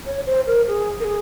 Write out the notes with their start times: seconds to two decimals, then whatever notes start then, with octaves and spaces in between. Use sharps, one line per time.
0.06 C#5
0.26 C5
0.47 A#4
0.68 G#4
1.00 A#4
1.04 G#4